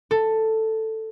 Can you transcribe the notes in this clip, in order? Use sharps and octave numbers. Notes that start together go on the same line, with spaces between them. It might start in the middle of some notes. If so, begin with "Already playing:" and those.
A4